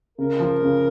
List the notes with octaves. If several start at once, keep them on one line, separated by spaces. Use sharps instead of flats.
C#3 A#4
F3
C#3